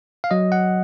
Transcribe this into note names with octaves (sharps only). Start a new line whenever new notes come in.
F5
F#3 D#5
F#5